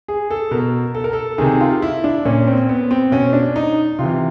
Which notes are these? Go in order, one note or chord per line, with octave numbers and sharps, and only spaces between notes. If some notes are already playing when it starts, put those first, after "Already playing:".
G#4
A4
B2 A#4
A4
A#4
A4
C3 D#3 G#4
F4
E4
D4
A#2 C#4
C4
B3
C4
B2 C#4
D4
D#4
C3 E3 F4